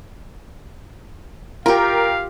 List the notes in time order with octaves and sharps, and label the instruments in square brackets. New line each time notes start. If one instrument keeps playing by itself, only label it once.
[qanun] F4 G4 [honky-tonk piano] A#4 G5 [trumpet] F5